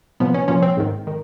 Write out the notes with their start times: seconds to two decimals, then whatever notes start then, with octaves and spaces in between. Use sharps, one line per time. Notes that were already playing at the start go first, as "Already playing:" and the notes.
0.20 C2 A#2 F3 B3
0.34 C#4
0.48 C2 A#2 F3 C#4
0.62 C4
0.77 G#1 G#2 D#3
1.07 D#3